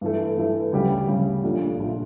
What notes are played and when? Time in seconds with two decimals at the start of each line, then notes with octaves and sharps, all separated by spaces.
0.01 G2 E3 A3
0.37 G2 E3 A3
0.72 D2 C#3 G3 C#4 G4
1.07 D2 C#3 G3 C#4 G4
1.43 A#1 A#2 A3 D4 F4
1.78 A#1 A#2 A3 D4 F4